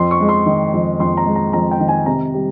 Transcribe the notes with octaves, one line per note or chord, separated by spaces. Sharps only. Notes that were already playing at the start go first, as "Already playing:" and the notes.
Already playing: F2 C6
C#6
G#3
C6
D#3
F2
F2 C6
A#5
G#3
A#5
F2 A#5
G5
D#3
G#5
C3 A#5
G3